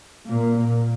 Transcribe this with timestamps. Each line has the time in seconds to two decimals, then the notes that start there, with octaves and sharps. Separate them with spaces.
0.28 A#2 A#3